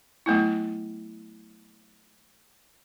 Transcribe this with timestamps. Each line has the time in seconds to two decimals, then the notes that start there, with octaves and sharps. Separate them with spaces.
0.26 F#3 A3 B3 E4